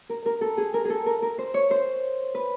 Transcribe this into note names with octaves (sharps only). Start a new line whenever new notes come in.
A#4
A#4
A4
G#4
A#4
G#4 A4
A#4
A#4
C5
C#5
C5
B4